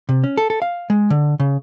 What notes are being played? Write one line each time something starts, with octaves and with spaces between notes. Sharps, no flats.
C3
C#4
A4
A4
F5
G#3
D3
C#3